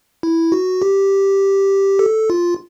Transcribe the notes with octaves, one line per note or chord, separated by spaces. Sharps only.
E4
F#4
G4
A4
F4